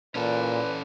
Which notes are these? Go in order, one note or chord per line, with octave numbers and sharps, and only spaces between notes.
A#2 E3 C#4 A4 B4 D5